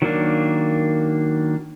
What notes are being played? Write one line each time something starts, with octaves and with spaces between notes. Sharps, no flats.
D#3 F#3 A#3 D4